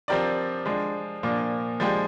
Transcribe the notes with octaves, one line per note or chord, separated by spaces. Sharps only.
F3 C4 G4 A#4 D5
F3 G#3 D4
A#2 F3 A#3 D4
F3 G#3 D4 G4